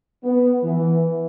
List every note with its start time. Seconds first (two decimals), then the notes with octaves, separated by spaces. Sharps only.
0.24 B3
0.63 E3